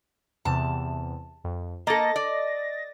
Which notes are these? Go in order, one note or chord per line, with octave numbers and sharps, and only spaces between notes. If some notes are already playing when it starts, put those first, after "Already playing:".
E2 C3 A5
F2
A#3 A4 D#5 A6 A#6
D5